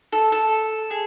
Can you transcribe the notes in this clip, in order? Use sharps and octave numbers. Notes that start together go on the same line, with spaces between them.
A4
A4
G#4